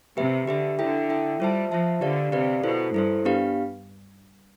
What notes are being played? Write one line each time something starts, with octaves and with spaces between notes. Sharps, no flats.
C3 G4 B4 E5
D3 G4 B4 E5
D3 E4 A4 E5 G5
E4 A4 E5 G5
G3 F4 C5 E5 A5
F3 F4 C5 E5 A5
D3 G4 B4 D5 F5
C3 G4 B4 D5 F5
B2 E4 A4 C5
G2 E4 A4 C5
B3 D4 G4 B4 F5